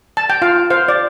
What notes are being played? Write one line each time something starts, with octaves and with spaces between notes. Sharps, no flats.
A5
G5
F4 F5
C5 F5
D5